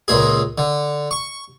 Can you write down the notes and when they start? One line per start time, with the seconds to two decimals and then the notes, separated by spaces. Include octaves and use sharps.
0.08 C#2 A#2 G#4
0.58 D3
1.11 C#6